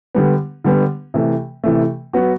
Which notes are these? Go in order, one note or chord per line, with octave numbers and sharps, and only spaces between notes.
D3 G3 B3
D3 G3 B3
C3 E3 A3
C3 E3 A3
F#3 B3 F#4